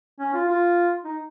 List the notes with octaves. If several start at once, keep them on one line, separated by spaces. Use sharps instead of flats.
C#4
F4
F4
D#4